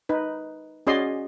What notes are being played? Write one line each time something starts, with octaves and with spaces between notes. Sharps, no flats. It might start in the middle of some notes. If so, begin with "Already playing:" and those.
D#4 B4
C#4 F#4 G#4 D5 D#5 C6